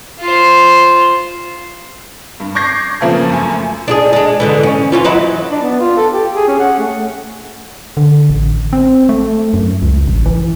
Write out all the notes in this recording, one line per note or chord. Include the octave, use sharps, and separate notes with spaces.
F4 C5
G2
C#6 D6 G6 G#6 A#6 C7
C#3 F3 A#3 B3 A4
F#2 A3 G#5
D4 E4 G#4
G#3 D4
G#2 D3 E3
C#4
E3 C#4 F4
F#3 D#4 E4
D4
B3
F4
A4
G4
G#4
C#4
F#5
A3
D3
A1
C4
A3
F#2
C#2
A1
E3